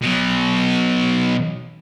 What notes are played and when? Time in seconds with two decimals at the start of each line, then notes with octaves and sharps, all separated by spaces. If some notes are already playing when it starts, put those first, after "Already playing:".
0.02 B2 F#3